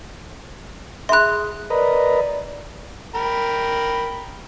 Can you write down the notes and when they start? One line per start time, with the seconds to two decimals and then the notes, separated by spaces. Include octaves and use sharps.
1.09 G#4 E5 B5 C6 F#6
1.70 A#4 B4 D5 D#5
3.15 A#4 G5 B5